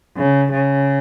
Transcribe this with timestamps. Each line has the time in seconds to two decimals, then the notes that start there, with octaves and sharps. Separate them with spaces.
0.17 C#3
0.52 C#3